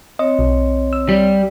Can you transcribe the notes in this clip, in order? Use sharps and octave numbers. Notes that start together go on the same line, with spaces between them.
C4 C#5 D#5
B1
E6
G3